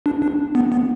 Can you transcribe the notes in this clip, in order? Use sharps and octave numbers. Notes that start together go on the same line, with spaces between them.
D4
D4
B3
B3